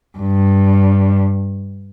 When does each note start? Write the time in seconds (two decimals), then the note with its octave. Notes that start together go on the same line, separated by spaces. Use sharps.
0.19 G2